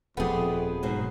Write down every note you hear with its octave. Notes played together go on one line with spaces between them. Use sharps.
D#1 F2 F3 A3 B3 F4 G4 G#4
G#2 B2 F#3